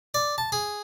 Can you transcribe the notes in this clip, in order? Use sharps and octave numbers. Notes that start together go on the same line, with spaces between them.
D5
A5
G#4